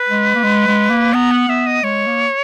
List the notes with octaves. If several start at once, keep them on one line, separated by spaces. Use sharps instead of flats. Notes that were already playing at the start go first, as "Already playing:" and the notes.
Already playing: B4
G#3
A#3
G#3
G#3
A#3
B3 A#5
F#5
B3 E5
D#5
G#3 C#5
A#3